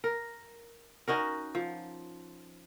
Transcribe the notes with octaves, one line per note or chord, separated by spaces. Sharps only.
A#4
C#4 D#4 F#4 A#4
F3